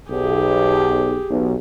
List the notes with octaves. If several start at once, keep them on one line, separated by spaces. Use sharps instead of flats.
B1 G4 G#4
B1